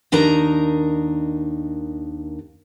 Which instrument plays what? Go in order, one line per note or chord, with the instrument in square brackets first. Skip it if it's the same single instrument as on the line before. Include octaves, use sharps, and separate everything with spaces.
[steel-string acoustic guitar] D#2 D4 D#4 A#4 A#5